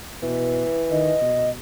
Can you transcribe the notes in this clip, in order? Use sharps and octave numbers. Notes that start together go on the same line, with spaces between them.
B2 E3
D#3 D#5
B2